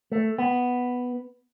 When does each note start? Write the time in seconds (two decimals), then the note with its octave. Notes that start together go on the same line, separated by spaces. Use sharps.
0.12 A3
0.39 B3